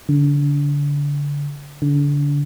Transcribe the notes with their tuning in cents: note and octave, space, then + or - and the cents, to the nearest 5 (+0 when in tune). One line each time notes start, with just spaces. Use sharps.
D3 -30
D3 -30